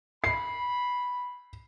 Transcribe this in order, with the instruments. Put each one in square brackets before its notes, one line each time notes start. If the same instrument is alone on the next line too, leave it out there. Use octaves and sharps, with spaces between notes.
[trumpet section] B5 [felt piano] C7